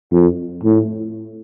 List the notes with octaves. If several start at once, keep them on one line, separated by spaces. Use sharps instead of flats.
F2
A2